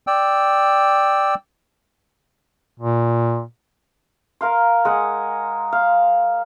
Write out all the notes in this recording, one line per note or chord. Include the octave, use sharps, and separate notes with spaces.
D5 G5 E6
A#2
A#4 F5 C6
G#3 F#5 G#5
F5